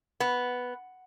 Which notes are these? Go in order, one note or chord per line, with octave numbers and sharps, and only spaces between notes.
B3